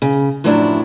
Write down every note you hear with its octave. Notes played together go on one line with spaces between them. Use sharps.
C#3
F#2 A2 F3 F#3 D4 E4